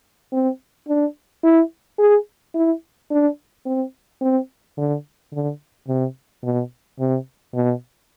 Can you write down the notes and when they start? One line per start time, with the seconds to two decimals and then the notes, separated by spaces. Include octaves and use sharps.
0.33 C4
0.88 D4
1.44 E4
1.99 G#4
2.55 E4
3.11 D4
3.66 C4
4.21 C4
4.77 D3
5.33 D3
5.88 C3
6.44 B2
6.99 C3
7.55 B2